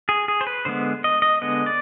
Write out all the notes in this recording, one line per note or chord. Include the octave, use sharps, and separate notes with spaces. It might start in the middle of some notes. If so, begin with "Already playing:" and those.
G#4
G#4
C5
B4
D3 G#3 B3 C5
D#5
D#5
D3 G#3 B3 D#5
D5